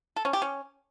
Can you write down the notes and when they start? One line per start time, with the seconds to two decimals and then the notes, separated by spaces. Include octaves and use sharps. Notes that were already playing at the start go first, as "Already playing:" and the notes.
0.16 A4
0.25 C#4
0.33 G4
0.42 C#4